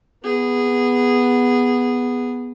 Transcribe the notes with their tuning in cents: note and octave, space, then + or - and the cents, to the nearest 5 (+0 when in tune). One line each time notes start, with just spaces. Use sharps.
B3 +0 G#4 -15